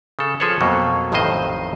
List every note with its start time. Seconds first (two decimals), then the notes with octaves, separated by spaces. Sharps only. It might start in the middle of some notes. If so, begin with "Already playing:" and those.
0.19 C#3 A4
0.40 F3 G#4 A4 B4 C#5
0.61 F2 B2 F#3 A#3
1.12 A1 F2 A2 D#3 C5 D#5